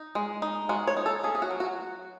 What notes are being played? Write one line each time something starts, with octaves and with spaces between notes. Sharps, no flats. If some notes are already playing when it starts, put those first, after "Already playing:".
Already playing: D#4
G#3
D#4
G#3 F#4
C#5
D#4
A4
C#4 G#4
G#4
F#4
F#3
F#4